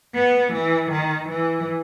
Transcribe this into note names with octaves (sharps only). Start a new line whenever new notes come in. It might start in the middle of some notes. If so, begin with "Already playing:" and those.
B3
E3
D#3
E3